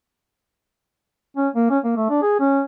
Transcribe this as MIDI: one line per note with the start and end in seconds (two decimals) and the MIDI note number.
1.37 1.49 61
1.55 1.66 58
1.70 1.79 61
1.84 1.94 58
1.96 2.07 57
2.09 2.19 62
2.22 2.35 68
2.40 2.62 61